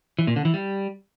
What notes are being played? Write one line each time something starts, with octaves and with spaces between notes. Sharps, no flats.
E3
A#2
D3
E3
G3